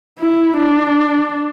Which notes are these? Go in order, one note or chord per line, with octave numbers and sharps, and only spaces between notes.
E4
D4